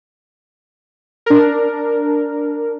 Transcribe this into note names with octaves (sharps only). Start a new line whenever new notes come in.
D4 A#4